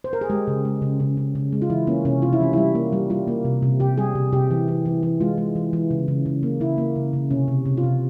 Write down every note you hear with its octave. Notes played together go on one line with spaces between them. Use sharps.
C5
A#4
G#4
G#3 G4
C#3
G#3
C#3
C#3
C#3
C#3
G#3
F4
E3 E4
A#3 C#4
C3 C#4
C3 F4
E4
E3 C#4
G3 E4
A#3
G3
G3 F4
A#3
C3
C3
C3 G4
G3 G#4
C3
C3 G4
E3
E3
E3
E3
G#3 F4
G#3
E3
E3
C#3
C#3
C#3
A#3
C#3 E4
A#3
C#3
C#3
C3 C#4
C3
C3
F4
C3